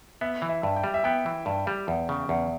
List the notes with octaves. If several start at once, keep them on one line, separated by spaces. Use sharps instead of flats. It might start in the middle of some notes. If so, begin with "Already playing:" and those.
B3 E5
E3
E5
G2
G5
G3
E5
B3 G5
E3
G2
G3
E2
C#3
E2